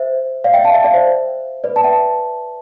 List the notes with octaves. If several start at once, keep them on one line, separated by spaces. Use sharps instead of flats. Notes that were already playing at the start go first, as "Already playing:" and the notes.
Already playing: C5 E5
D5 F5
E5 G5
F5 A5
E5 G5
D5 F5
C5 E5
B4 D5
A5
E5 G5